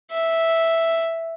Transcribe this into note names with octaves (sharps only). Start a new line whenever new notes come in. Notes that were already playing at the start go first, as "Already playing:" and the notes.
E5